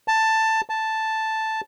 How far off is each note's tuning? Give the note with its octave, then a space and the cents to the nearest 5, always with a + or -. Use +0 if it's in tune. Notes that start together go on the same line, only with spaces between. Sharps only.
A5 +10
A5 +0